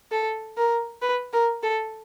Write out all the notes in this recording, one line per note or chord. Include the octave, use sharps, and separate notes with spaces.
A4
A#4
B4
A#4
A4